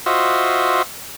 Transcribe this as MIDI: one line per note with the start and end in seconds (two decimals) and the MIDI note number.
0.06 0.82 65
0.06 0.82 66
0.06 0.82 72
0.06 0.82 75
0.06 0.82 76